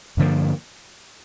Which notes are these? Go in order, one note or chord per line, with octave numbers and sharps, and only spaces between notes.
G2 D3 F3 A#3